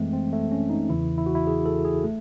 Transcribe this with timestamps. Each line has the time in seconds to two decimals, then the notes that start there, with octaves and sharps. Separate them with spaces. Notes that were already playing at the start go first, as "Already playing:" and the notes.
Already playing: F#2 E3 G#3 A3 C4
0.13 C4
0.33 A3
0.52 C#4
0.70 D#4
0.90 E2 C#3 E3 E4
1.18 E4
1.26 F#4
1.35 E4
1.47 G#4
1.66 A4
1.85 G#4
2.04 A3